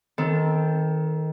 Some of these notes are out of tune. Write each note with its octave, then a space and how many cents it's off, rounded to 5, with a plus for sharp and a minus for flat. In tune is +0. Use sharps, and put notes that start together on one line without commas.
D#3 +20 C4 +0 A4 +0